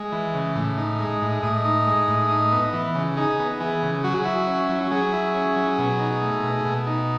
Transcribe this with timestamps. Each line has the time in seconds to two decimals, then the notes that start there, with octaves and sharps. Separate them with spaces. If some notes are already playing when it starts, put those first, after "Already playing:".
Already playing: G#3
0.12 E3
0.34 C#3
0.55 A2
0.78 D#4
1.00 G#3
1.22 A2
1.43 A2 D#5
1.65 D#4
1.87 G#3
2.08 A2
2.29 D#4
2.52 B3
2.73 E3
2.95 C#3
3.17 D#4 G#4
3.39 B3
3.60 E3 G#4
3.83 C#3
4.04 F#3 F#4
4.14 G#4
4.24 E4 F#4
4.47 C#4
4.70 F#3
4.91 F#3 G#4
5.13 E4
5.34 C#4
5.56 F#3
5.78 B2
5.99 D#4
6.22 A3
6.43 B2
6.65 B2
6.87 D#4